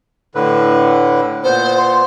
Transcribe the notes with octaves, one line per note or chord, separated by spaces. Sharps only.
A2 D3 B4
A#2 B3 C5
C6